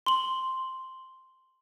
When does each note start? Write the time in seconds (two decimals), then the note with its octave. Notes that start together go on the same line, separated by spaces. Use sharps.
0.06 C6 F#7